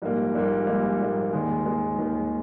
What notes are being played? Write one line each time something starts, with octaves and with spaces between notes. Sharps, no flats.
A#1 G#2 G3 A#3
A#1 G#2 G3 A#3
A#1 G#2 G3 A#3
A#1 G#2 G3 A#3
D#2 D#3 G#3
D#2 D#3 G#3
D#2 D#3 G#3